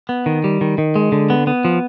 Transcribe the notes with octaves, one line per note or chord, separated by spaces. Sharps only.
B3
D#3
G3
D#3
D#3
G#3
D3
B3
B3
F3